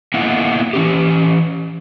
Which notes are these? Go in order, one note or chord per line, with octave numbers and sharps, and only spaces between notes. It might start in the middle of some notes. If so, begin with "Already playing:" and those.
A#3 B3 E4 D#5 E5 F#5
E3 C#4 G4